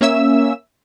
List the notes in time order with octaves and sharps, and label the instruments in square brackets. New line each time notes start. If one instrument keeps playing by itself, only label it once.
[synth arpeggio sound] A#3 C#4 E5 E6